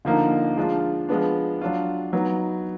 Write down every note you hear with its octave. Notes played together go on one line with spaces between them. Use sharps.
D3 F3 A#3 D#4
F3 G#3 D4 F4
F3 G#3 B3 D4
F#3 D4 F4
F#3 B3 D#4